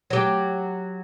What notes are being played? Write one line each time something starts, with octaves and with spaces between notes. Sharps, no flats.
F#3 G4